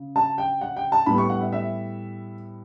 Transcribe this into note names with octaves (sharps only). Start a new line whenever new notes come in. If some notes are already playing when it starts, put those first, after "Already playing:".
Already playing: C#3
A5
G5
F#5
G5
A5
A2 G3 B3 B5
C#6
F#5
E5
E5